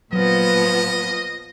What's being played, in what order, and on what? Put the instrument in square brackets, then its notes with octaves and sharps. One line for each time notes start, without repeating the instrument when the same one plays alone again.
[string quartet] A#2 F3 B3 [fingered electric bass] F#3 [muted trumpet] D#5